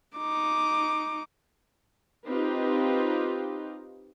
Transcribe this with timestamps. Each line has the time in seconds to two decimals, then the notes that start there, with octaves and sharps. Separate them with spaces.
0.17 D#4 D6
2.26 C4 D#4 F4 G4 B4